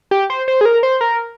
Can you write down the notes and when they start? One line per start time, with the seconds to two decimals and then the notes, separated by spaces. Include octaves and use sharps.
0.11 G4
0.30 C5
0.48 C5
0.61 G#4
0.65 A#4
0.83 C5
1.01 A#4